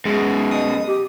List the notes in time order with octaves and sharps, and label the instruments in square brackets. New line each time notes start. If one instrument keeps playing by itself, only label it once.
[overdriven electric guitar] F#2 B2 [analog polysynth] G#3
[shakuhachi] D#5 [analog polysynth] D#6
[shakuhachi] G4